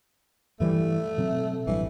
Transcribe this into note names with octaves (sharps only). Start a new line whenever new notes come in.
G2 E3 G3 A3
B2 F#3 C4
A1 G2 E3 F#3